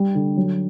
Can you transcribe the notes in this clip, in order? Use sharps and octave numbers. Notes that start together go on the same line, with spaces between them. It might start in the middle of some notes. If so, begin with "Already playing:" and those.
Already playing: G3
D3
F#3